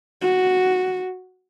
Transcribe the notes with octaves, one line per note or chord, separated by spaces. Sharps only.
F#4